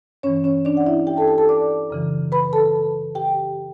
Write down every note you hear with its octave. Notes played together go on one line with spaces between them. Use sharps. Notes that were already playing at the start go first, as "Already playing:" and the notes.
G2 E3 C#4 C#5
C#4 C#5
D4 D5
F#5
E4 E5
G4 G5
A4 A5
A4 A5
A4 A5
D5 D6
F#2 C#3 E3
B4 B5
A4 A5
G4 G5